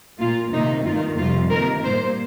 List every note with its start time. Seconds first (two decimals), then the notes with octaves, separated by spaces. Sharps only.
0.19 A#2 A#3 F4
0.52 C3 D#3 A#3 D#4
0.85 G2 D#3 A#3 F4
1.18 F2 C3 G3 F4
1.51 C3 D#3 A#3 A#4
1.84 A#2 G3 A#3 C5